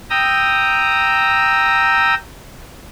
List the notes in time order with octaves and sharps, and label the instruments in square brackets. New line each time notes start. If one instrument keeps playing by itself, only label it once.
[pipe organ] G5 A#5 D#6 E6